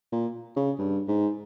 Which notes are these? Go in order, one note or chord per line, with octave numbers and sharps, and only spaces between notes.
A#2
C#3
G2
G#2